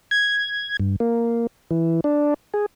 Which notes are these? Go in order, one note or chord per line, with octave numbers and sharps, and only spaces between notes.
G#6
G2
A#3
E3
D4
G#4